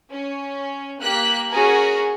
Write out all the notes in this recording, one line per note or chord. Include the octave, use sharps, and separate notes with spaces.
C#4
A#3 G4 F#6 B6
C#4 F#4 G#4 A#4 G#5